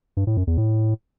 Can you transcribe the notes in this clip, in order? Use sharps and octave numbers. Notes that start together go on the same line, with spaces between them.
G2
A2
F#2
E2
A2